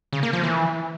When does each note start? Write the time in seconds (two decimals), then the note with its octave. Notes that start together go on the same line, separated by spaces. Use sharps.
0.13 C#3
0.23 A#3
0.33 F3
0.43 E3